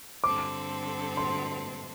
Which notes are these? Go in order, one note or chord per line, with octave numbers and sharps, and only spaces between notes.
G2 D3 C4 A4 D6
C6